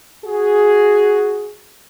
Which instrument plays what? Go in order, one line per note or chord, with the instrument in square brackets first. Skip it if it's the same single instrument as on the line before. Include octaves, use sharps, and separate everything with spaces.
[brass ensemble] F#4 G#4